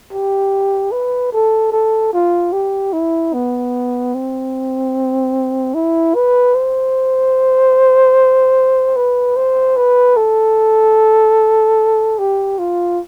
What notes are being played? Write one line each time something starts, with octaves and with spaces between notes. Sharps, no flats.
G4
B4
A4
A4
F4
G4
E4
B3
C4
E4
B4
C5
B4
C5
B4
A4
G4
F4